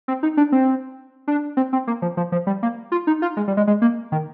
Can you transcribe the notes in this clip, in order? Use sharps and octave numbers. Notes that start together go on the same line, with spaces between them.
C4
D#4
D4
C4
D4
C4
C4
A#3
F3
F3
F3
G3
A#3
F4
D#4
F4
G#3
G3
G#3
G#3
A#3
D#3